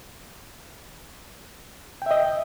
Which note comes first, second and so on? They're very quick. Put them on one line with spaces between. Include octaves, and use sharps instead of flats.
G5 E5 D#5